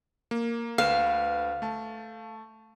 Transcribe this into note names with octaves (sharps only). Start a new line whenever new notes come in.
A#3
D2 B4 F5 E7
A3 A5